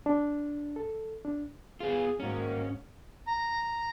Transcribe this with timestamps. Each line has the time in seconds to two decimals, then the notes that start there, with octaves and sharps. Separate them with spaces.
0.06 D4
0.76 A4
1.25 D4
1.80 B3 F4 G#4
2.20 G#2 D#3 A#3 C#4 F#4
3.27 A#5